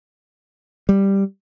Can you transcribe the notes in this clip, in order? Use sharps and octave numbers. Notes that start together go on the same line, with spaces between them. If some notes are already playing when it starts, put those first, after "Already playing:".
G3